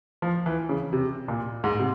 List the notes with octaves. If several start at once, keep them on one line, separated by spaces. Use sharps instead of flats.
F3
E3
C#3
C3
A#2
G#2
C3